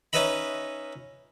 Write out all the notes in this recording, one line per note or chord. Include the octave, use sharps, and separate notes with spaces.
C#4 D#4 B4 D#5 E5 B5